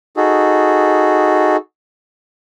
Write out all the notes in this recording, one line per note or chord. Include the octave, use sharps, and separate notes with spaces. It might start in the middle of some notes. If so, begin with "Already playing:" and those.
D#4 F#4 G#4 A4